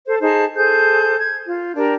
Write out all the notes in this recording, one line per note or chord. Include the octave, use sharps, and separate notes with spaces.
A4 C5
D#4 G#4 C5 A5
G#4 A4 C5 G6
G#6
F4
D4 G4 A#4